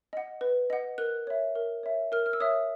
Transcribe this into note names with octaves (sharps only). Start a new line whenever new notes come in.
D#5 F#5
B4
D#5 F#5
A#4 F#6
C#5 E5
A#4
C#5 E5
A#4 F6
F6
E6
C#5 E5 D#6